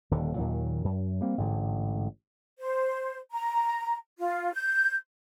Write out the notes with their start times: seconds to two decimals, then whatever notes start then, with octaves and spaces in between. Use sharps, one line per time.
0.11 D#1 D#2 D3
0.36 D#2 A#2 D#3 F#3
0.84 F#2
1.21 G3 A#3 C4
1.38 A1 G#2 D3
2.59 C5
3.32 A#5
4.19 F4
4.53 G6